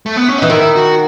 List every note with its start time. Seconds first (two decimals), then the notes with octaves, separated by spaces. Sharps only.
0.06 A3
0.16 B3
0.28 C#4
0.38 E3 D#4
0.50 D#3 E4
0.76 F#4